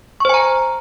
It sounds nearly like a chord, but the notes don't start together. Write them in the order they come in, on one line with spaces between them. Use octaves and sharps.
C#6 C5 G#5 A#5